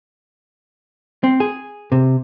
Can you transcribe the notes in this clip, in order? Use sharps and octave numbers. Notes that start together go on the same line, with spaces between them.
C4
G#4
C3